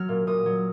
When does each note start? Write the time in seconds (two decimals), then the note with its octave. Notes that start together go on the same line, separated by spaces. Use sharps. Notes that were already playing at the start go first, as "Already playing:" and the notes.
Already playing: F#3 F6
0.09 A#2
0.27 A#2 D#6
0.46 F#3